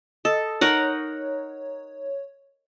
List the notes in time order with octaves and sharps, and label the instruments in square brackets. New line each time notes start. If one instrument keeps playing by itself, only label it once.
[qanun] A4 [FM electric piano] D#5
[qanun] D#4 A#4 F#5 [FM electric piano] C#5